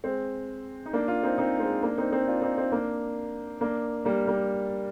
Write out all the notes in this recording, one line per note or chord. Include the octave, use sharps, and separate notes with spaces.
G#3 C4
D#4
A#3 D4
D4 F4
C4 D#4
C4 D#4
G#3 C4
A#3 D4
C4 D#4
C4 D#4
D4 F4
C4 D#4
C4 D#4
A#3 D4
A#3 D4
G3 A#3
G3 A#3